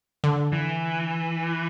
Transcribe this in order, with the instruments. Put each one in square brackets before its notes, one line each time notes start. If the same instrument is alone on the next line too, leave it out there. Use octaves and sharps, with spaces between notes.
[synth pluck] D3
[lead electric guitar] E3